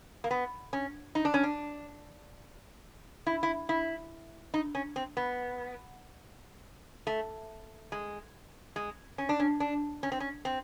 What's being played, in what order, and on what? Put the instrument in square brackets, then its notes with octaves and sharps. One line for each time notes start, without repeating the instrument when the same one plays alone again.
[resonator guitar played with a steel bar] A#3
B3
C#4
D#4
D4
C#4
D4
E4
E4
E4
D#4
C#4
C4
B3
A3
G#3
G#3
C#4
D4
C#4
D4
C#4
C4
C#4
C4